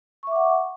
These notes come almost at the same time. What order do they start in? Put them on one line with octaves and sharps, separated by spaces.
C#6 E5 D6 F#5